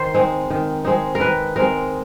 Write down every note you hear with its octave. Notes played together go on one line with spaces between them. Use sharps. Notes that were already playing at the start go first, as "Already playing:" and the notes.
Already playing: D#3 C5
G#3 C4 D#4
D#3
G#3 C4 D#4
A#4
D#3 B4
G#3 C4 D#4 A#4